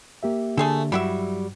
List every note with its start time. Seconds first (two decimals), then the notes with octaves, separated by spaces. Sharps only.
0.23 A#3 G4 E5
0.58 D3 A3 G#4 A4
0.92 G2 F#3 G3 E4 F#4 E5